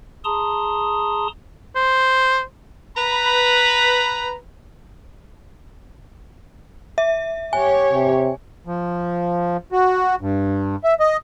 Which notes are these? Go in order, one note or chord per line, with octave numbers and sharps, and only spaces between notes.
G#4 A5 A#5 C6 D#6
C5
B4 A#5 B5
E5
G4 C#5 G#5
C3
F3
F#4
G2
E5
D#5